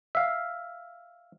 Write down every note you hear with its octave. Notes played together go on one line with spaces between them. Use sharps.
E5 F5